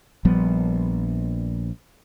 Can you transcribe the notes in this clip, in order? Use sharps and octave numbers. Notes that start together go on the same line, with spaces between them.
A#1 F3 G3 B3